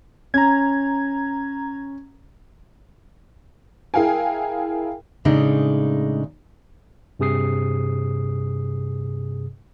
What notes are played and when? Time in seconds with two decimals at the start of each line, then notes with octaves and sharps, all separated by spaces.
0.34 C#4 A#5 G#6
3.94 E4 G#4 A#4 F5 G5 G#5
5.25 A2 C#3 G#3 D4 D#4
7.19 G2 C3 G#4 D#6 C7